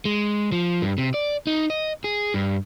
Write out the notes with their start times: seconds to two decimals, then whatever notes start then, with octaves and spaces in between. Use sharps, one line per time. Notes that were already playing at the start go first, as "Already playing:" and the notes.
0.05 G#3
0.52 F3
0.82 G2
0.98 C3
1.14 D5
1.47 D#4
1.70 D#5
2.04 G#4
2.34 G2